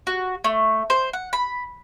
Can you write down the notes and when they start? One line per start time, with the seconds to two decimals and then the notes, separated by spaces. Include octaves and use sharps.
0.07 F#4
0.44 A3
0.90 C5
1.13 F#5
1.33 B5